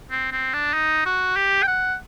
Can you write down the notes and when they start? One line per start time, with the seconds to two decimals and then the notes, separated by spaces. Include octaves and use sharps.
0.11 C4
0.32 C4
0.53 D4
0.73 D#4
1.06 F#4
1.36 G4
1.63 G5
1.68 F#5